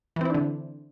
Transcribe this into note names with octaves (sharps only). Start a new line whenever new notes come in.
D3 E3 C4 D4 E4